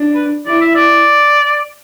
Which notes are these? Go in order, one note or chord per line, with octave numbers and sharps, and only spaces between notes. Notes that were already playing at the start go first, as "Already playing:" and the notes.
Already playing: D4
B4
E4 D5
E5
D5